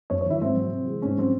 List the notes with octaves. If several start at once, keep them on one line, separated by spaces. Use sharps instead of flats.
F#2 C#5
C#5
D#3 F#3 E4
G#2 C4
F#3
C3
E3 G#3
G#2 C#4
F#3 C4